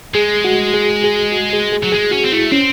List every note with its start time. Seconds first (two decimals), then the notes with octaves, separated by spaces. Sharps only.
0.14 G#3 G#4
0.45 F#4
0.74 G#4
1.04 G#4
1.32 F#4
1.53 G#4
1.73 G#4
1.83 F#3
1.92 G#3 G#4
2.11 C#4 F#4
2.25 C4
2.32 A3 E4
2.51 C4 C#4